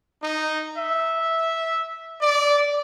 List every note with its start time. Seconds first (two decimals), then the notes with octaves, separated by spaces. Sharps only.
0.21 D#4
0.76 E5
2.20 D5